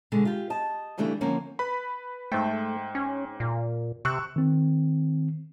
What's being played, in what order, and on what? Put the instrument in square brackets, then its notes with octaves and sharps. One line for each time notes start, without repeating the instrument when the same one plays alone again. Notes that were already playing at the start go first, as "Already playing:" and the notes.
[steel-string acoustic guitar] B2 D3 G#3
F4 G4
D#5 A5
C#3 E3 G3 A3 D4
D3 F3 A#3 C#4
[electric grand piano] B4 B5
[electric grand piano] G#2 C5 G5 [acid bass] A3
[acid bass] C#4
A#2
[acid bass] C3 [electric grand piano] C#6 E6 F#6
[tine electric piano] D#3 C4